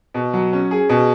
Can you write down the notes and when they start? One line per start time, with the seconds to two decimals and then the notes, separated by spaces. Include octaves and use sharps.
0.14 B2
0.33 F#3
0.53 C#4
0.71 G#4
0.89 B2